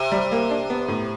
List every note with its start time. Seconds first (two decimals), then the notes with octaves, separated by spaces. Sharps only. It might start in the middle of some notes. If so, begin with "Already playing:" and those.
Already playing: C3
0.12 G3
0.31 A#3
0.51 D4
0.70 B3
0.88 A2